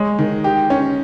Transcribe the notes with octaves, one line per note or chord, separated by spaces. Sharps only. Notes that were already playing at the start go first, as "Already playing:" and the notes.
Already playing: G#3 C#5
D#3
G4
C#4